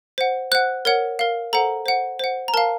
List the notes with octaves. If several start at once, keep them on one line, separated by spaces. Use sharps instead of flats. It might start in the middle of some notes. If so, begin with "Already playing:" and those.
C5 F#5
C5 F#5 F#6
A#4 C#5 F#5
A#4 F5
A4 C5 F#5 A#5
C5 F#5
C5 F#5
A#5
A#4 F5 A5